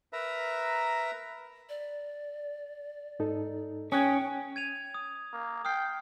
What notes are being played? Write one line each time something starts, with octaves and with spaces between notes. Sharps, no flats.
A#4 B4 E5 A#5
D5
G#2 D#4 A4
C#4 G5 D#6 F#6 G#6
G#6 D#7 F7
D#6
A#3
G5 D#6 F6 C7